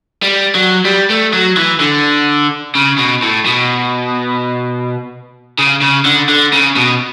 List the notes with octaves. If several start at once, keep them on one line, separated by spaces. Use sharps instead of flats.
G3
F#3
G3
A3
F#3
E3
D3
C#3
B2
A2
B2
C#3
C#3
D3
D3
C#3
B2